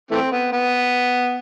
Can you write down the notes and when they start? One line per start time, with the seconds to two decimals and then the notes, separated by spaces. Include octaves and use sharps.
0.11 E3 A3 C4
0.32 B3
0.52 B3